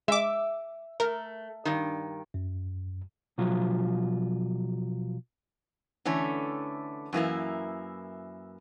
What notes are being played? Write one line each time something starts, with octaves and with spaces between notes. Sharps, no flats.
G#3 E5 D6
A3 A#4
G2 D#3
F#2
B2 F3 F#3 F4
D3 E3 A3 C#4
F#2 E3 A#3 E4